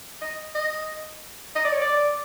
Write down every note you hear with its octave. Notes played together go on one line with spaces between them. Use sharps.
D#5
D#5
D#5
D5
C#5
D5